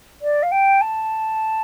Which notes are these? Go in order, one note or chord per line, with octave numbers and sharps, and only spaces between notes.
D5
F5
G5
A5